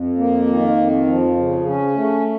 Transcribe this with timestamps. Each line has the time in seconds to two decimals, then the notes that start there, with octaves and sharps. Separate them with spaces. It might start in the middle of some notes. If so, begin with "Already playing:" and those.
Already playing: F2
0.17 A#3
0.46 D#3
0.76 F2
1.07 F3
1.36 C#3
1.66 C#4
1.95 A3